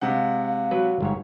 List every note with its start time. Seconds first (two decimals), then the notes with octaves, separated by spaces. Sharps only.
0.01 C3 G#3 F5 F#5
0.71 F#3 B4
1.01 G1 G#2 C#5